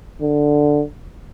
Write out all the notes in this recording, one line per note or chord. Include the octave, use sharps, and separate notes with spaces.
D3